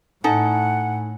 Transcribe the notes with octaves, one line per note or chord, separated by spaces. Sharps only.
A2 D#4 A4 F#5 G#5